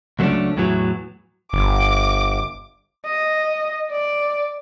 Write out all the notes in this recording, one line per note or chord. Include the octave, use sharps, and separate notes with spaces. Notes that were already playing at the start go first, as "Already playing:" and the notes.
C#2 F#3 G3 A3 C#4 D4
E2 A2 E3 F#3
G1 D6
D#5
D5